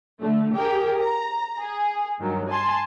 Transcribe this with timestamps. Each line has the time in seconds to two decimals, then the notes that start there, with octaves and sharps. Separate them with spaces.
0.20 D3 A3
0.55 G4 G#4 A#4 G5
1.00 A#5
1.59 G#4
2.19 G2 D#3 F#3
2.50 G#5 A5 C6